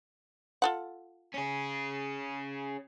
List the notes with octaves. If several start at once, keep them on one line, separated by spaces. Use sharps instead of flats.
F4 A4 F#5
C#4 G#4